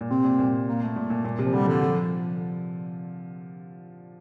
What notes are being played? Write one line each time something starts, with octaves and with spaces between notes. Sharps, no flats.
A#2
C3 C4
A#2
A#2
A#3
A3
A#2
A#2
A#2
C3
F3
D3 G3
D3 F3
F3